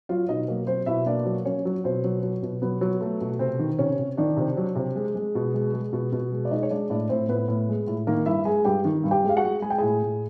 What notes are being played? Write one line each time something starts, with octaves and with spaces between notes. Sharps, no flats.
F#3 F4 F5
B2 D#4 D#5
F#3 A#3 A#4
F#3 C4 C5
B2 E4 E5
A#3 D4 D5
F#3
F#3 C#4 C#5
F#3
B2 C4 C5
F#3
F#3
B2
F#3 B3 B4
F#3
A3
B2
C3 C4 C5
D#3
C3 C#4 C#5
C3
D#3 D4 D5
C3
F#3
C3
G#3
G#3
B2
G#3
G#3
B2
B2
G#3
D5
G#3 D#4 D#5
C#5
G#3 D4 D5
A2 D4 D5
A2 C4 C5
A2 B3 B4
A2
G#3
A2
D#3 A#3 A#4
G2 E4 E5
G#3 G#4 G#5
G2 G4 G5
D#3
G2
G4 G5
G#3
F5
F#4 F#5
G#3
G#3 G#5
G5
A2 G#4 G#5
A2